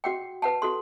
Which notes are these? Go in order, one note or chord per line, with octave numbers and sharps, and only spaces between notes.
F#4 F#5 G5
B4 F#5 A5
F#4 A4 C6